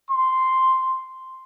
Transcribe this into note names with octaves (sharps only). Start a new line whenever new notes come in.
C6